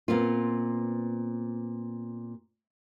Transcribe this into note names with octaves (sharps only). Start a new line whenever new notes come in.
A#2 B3 C4 F4